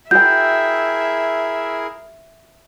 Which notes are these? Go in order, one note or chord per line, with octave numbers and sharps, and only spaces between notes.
E4 F#4 G#4 A#4 E5 G5 G6